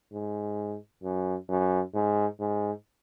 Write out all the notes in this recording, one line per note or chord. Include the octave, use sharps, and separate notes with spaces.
G#2
F#2
F#2
G#2
G#2